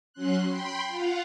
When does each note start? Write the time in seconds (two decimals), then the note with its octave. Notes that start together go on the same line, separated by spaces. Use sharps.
0.13 F#3 C#4 C6 F#6
0.47 G5 B5 C6
0.88 F4 F5 F#5